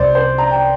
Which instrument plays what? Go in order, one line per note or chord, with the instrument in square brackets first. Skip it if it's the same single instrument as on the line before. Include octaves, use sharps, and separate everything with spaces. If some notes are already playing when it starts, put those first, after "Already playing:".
Already playing: [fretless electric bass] C2 C3 G3 [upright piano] C5 D5
[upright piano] C5
A#5
G5